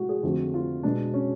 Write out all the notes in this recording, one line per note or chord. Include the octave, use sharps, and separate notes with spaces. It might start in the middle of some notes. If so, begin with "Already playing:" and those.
Already playing: A2 G#3 F#4
G#4
F2 D3 F3 A3 F#4
F4
B2 G#3 D4
C#4